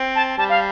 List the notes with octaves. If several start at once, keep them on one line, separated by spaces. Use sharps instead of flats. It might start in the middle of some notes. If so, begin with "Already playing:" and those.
Already playing: C4
A5
G3 A5
F5